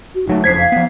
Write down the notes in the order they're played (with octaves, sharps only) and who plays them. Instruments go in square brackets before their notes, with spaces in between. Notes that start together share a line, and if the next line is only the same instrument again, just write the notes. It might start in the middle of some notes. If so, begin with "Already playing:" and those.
[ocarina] F#4
[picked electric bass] G1 F#3 A3 [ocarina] D#4
[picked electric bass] F#1 F2 [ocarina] C5 [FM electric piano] G#6 B6 C7
[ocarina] F5
[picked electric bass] F3 B3